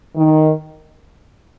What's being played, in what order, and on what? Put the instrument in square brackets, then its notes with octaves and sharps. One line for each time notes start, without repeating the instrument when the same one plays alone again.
[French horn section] D#3